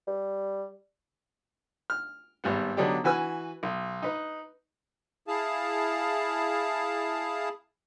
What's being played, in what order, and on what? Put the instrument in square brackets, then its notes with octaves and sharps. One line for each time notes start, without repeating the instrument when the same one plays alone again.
[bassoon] G3
[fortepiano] F6
G#1 G3 B3
D3 F#3 B3 D4 D#4 G4
E3 F#4 B4 G#5 E6
B1
D#4 B4
[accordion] E4 G#4 F5 A5